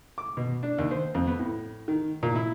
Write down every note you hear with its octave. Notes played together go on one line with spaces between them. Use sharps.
D6
B2
D4
D#2
C5
F2
B3
A2
D#3
A#2
E4